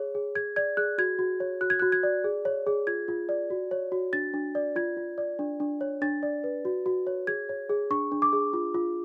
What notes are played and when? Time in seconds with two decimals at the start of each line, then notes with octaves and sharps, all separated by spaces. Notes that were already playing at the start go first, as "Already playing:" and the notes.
Already playing: G#4 C#5
0.15 G#4
0.35 G#4 G#6
0.56 D5 G#6
0.77 G#4 F#6
0.98 F#4 G#6
1.19 F#4
1.40 C#5
1.61 F#4 F#6
1.70 G#6
1.80 F#4 F#6
1.92 G#6
2.03 D5
2.24 G#4
2.45 C#5
2.67 G#4
2.87 F4 G#6
3.08 F4
3.29 D5
3.50 F#4
3.71 C#5
3.92 F#4
4.13 D4 A6
4.34 D4
4.55 D5
4.76 F4 G#6
4.97 F4
5.18 D5
5.39 D4
5.60 D4
5.81 C#5
6.02 D4 A6
6.23 D5
6.44 B4
6.65 F#4
6.86 F#4
7.07 C#5
7.27 G#4 G#6
7.49 C#5
7.69 G#4
7.90 D4 C#6
8.12 D4
8.22 D6
8.33 G#4
8.53 F4
8.74 F4